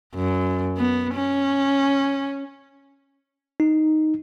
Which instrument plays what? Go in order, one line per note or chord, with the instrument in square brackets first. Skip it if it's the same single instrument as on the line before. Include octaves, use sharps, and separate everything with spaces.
[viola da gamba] F#2
B3
C#4
[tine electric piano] D#4